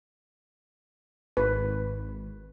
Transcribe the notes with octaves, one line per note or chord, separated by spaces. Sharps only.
G#1 B4